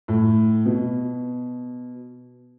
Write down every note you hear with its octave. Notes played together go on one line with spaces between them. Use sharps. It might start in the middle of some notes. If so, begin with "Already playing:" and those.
A2
B2